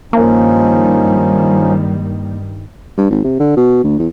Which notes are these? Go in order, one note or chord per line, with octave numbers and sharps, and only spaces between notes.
G2 D#3 F3 G3 A#3 C#4 D#4
G2
G#1
C3
D3
B2
D2
E2